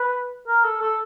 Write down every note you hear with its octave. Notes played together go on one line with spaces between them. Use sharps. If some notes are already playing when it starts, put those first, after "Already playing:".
Already playing: B4
A#4
A4
A4